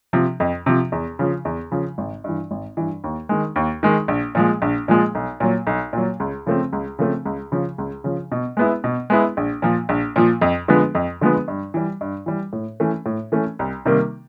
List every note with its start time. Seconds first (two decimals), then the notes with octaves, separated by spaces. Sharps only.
0.13 C3 F3
0.40 F2
0.66 C3 F3
0.92 E2
1.19 C#3 F3
1.45 E2
1.72 C#3 F3
1.98 G#1
2.24 G2 E3
2.51 G#1
2.77 G2 E3
3.04 D#2
3.29 D#3 G#3
3.56 D#2
3.83 D#3 G#3
4.08 A#1
4.35 A#2 F3 G#3
4.62 A#1
4.88 A#2 F3 G#3
5.15 B1
5.40 A#2 F#3
5.67 B1
5.93 A#2 F#3
6.20 C#2
6.47 C#3 F3 A3 C4
6.73 C#2
6.99 C#3 F3 A3 C4
7.25 C#2
7.52 C#3 F3
7.78 C#2
8.04 C#3 F3
8.32 B2
8.57 G#3 B3 E4
8.84 B2
9.10 G#3 B3 E4
9.37 A#1
9.62 A#2 F3
9.89 A#1
10.16 A#2 F3
10.41 F2
10.68 D3 F3 G#3 B3
10.95 F2
11.21 D3 F3 G#3 B3
11.48 G2
11.74 E3 G3
12.01 G2
12.26 E3 G3
12.53 A2
12.80 E3 A3 C#4
13.06 A2
13.32 E3 A3 C#4
13.59 C2
13.85 C3 D#3 G3 A#3